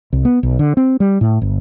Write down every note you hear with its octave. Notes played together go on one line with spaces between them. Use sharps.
C2
B3
B1
D3
C4
G3
A2
G1